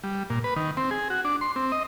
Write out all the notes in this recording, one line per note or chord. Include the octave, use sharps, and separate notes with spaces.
G3
A#2
B4
D#3
C4
G#4
F#4
D4
C6
C4
D#5